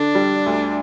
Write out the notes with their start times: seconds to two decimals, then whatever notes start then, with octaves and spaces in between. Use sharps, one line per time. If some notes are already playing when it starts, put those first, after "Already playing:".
Already playing: D3 D4
0.15 G3
0.46 D2